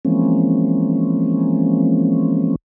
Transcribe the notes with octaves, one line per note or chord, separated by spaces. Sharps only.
E3 F3 G#3 A#3 C4 C#4